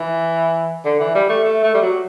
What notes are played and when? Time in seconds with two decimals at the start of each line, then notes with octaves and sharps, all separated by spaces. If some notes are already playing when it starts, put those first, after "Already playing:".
Already playing: E3
0.85 D3
1.00 E3
1.15 G3
1.29 A3
1.44 A3
1.63 A3
1.74 G3
1.82 F#3